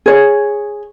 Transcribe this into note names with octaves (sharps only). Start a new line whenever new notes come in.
G#4 C#5